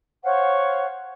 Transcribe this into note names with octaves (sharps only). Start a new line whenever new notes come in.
C5 C#5 F5 F#5